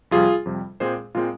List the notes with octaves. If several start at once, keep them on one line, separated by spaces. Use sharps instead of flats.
F2 C3 G3 F4 G#4
F2 C3 G3
A#2 G#3 C4 G#4 C5
A#2 G#3 C4 F4